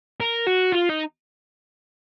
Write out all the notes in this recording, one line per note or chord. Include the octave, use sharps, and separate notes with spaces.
A#4
F#4
F4
D#4